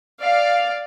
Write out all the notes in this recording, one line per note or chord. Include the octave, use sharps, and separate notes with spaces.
D5 F5